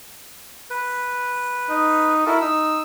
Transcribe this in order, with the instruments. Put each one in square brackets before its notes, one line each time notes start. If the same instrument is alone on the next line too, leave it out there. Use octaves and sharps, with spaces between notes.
[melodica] B4
[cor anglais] D#4
[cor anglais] E4 [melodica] F#4 A4 A#4
[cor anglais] D#4 [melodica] E6